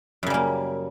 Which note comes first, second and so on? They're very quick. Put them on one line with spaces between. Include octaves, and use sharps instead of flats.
F#2 C#3 G3 A#3